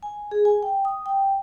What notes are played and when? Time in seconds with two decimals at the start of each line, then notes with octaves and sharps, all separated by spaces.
0.03 G#5
0.31 G#4
0.45 G#5
0.63 G5
0.85 D#6
1.06 G5